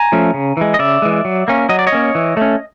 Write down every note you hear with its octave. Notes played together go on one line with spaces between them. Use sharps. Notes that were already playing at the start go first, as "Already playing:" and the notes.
Already playing: G#5 A#5
F3 A3 C#4
C#3
E3 G#3
D#5
C#3 D5 E5
E3 G#3
F#3
A#3 C#4
F#3 D#5
D5
C#5 D#5
A#3 C#4
E3
A3 C#4